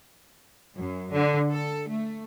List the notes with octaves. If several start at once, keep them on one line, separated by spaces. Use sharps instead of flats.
F#2
D3
A4
A3